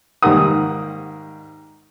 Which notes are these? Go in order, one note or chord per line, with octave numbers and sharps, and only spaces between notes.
G#2 D#3 G3 A#3 F#5 D#6